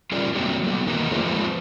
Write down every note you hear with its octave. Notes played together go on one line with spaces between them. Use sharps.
G3 C#4 F4 G#4 A#4 D5
F#3 G3 A3 A#3 C4 F#4
F#3 B3
D#3 E3 A#3 D#4 A#4 B4
A3 A#3 F4 G#4 C#5
F3 G#3 C4 F4 B4 C5